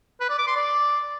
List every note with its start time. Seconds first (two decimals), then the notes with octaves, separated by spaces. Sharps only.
0.21 B4
0.29 D5
0.38 D6
0.47 C6
0.56 D5